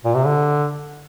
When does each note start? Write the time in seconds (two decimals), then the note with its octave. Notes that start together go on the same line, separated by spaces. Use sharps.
0.05 A#2
0.15 C3
0.25 D3